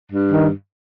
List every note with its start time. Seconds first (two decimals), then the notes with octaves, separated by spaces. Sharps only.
0.11 G2
0.31 D#3